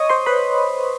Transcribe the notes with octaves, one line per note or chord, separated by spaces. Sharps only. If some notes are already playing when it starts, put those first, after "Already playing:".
Already playing: C#5 D#5 C#6 D#6
C5 C6
B4 B5